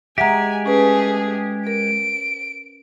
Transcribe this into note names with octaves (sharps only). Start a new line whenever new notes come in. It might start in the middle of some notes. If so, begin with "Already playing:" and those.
G#3 G4 E5 F#5 G#5 A#5
A3 C#4 G#4 B4
A#4 D7